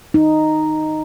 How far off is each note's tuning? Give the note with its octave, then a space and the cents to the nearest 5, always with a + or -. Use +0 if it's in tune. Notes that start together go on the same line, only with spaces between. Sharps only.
D#4 -5